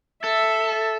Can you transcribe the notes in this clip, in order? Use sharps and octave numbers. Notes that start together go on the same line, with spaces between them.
A4 E5